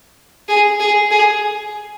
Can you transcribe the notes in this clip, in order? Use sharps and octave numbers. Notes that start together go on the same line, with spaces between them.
G#4
G#4
G#4